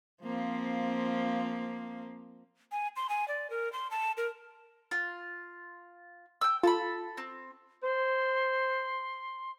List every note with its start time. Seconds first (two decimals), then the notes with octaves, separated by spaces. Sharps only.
0.23 F3 A#3 C4
2.72 G#5
2.96 C6
3.09 G#5
3.28 D5
3.50 A#4
3.73 C6
3.91 A5
4.17 A#4
4.91 F4
6.41 G5 E6
6.63 F4 A4 A5 B5
7.17 C4
7.83 C5 C6